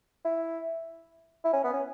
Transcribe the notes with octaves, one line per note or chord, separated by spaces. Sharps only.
E4
E4
C#4
B3
C#4